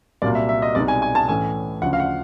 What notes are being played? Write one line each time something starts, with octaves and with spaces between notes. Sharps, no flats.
C2 A#2 F#3 A#3 D5
E5
E5
D#5
C2 B2 G#3 B3 D#4 D5
G#5
G#5
A5
A2 E3 A3 C#4 G#5
D2 C#3 F3 F#5
F5
F#5